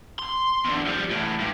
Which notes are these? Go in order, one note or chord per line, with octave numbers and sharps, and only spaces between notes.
C6
E2 D3
F3 G3
E2 A2
G2